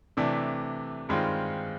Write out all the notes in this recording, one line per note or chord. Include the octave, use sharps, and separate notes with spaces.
C3 E3 A3 D4
G2 D#3 G#3 C4 F4